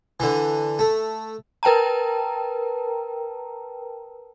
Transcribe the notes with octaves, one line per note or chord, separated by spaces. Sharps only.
D3 E3
A3
A#4 B4 G5 A5 A#5